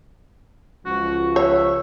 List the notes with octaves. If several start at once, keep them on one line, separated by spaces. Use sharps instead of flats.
C#2 F3 F#4
C#5 E5